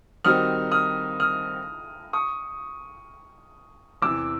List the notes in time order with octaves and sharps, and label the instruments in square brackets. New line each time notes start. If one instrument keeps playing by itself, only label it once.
[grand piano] D#3 G3 C4 D#4 F#4 [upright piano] D#6 F6
[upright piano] D#6 F6
D#6 F6
C#6 D#6
[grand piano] E2 C3 E3 [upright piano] D6 E6